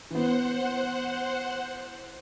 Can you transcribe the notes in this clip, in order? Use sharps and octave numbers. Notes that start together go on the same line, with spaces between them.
E3 B3 C5 F#5